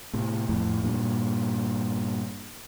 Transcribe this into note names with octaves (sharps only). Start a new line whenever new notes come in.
A2 C3
F2 A2
G2 A#2